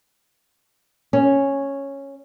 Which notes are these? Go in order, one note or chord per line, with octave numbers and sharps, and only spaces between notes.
C#4